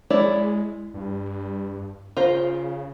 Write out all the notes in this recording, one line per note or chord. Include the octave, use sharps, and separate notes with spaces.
G#3 E4 C#5 D5
G2
C#3 F4 A#4 C5